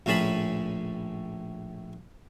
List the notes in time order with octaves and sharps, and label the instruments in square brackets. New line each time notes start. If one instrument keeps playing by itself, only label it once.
[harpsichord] A#1 A2 C#4 G#4 A5 B5